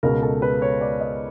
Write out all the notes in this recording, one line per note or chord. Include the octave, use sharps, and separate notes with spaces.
C#2 B2 G#3 A#4
A4
B4
C#5
D5
D#5